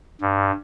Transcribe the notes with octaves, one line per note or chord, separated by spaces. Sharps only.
G2